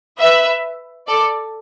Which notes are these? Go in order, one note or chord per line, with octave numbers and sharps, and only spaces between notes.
B4 E5
A4 D5